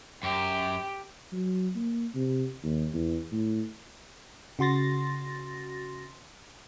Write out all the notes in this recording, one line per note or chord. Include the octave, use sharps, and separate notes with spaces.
F#2 G4
F#3
A#3
C3
D#2
E2
A2
C#3 F#4 C6 A6 A#6